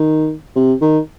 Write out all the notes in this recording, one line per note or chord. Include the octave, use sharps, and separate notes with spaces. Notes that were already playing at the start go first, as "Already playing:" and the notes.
Already playing: D#3
C3
D#3